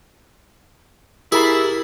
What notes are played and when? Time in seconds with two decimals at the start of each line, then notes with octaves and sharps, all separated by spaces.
1.32 E4 G4 G#4 A#4 B5 A6 C7